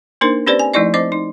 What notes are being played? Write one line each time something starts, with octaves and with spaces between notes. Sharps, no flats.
A#3 D4 D#4 A#4 C5
C4 C#4 G4 B4 C5 D5
G#5
F3 A3 D#4 E4 D5 D#5
C4 C5 D#5 D6
D#4